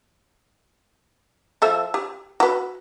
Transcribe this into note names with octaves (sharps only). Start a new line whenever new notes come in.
F3 A4 E5
G4
F#4 B4